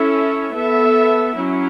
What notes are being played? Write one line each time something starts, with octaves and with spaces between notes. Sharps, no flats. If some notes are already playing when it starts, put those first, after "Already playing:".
Already playing: C#4 E4 A4 E5
B3 A4 E5
F#3 C#4 E4